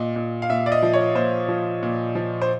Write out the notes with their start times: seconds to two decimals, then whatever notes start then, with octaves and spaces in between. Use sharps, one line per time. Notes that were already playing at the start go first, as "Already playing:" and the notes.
Already playing: A#2 D#5
0.16 A#2
0.42 F5
0.50 A#2 E5
0.66 D5
0.72 D#5
0.83 F3
0.93 C#5
1.15 A#2 C5
1.48 F3
1.83 A#2
2.15 F3
2.42 C5